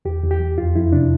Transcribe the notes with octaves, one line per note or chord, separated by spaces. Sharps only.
E2 G4
E2
G4
E2
F2 F4
F2 E4
C3 D4